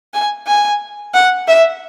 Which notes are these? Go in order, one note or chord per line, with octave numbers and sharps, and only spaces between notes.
G#5
G#5
F#5
E5